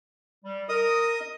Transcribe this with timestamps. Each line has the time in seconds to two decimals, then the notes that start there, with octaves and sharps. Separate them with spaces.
0.44 G3
0.69 A#4 D#5 D#6